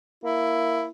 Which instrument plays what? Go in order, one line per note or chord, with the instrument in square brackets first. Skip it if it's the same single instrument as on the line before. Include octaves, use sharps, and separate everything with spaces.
[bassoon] A#3 [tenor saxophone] E4